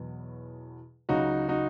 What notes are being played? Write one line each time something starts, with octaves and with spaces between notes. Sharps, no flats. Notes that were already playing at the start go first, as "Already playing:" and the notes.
Already playing: E2 B2 F#3
C#2 C#3 F#3 D#4 F#4
D#4 F#4